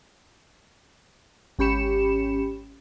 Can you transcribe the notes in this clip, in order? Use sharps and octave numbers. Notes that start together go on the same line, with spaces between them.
G#1 C#4 G4 B5 C#7 E7